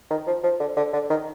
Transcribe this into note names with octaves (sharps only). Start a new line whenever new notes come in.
D#3
F3
F3
D3
D3
D3
D#3